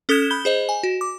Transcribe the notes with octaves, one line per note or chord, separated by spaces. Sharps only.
C#4 A4 D#6 F#6 G#6 E7
B5 G6 G7
G#4 C5 D#5
G#5
F#4
D6